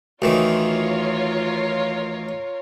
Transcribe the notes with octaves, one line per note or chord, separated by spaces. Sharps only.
D2 D#3 E3 F4 A#4 C#5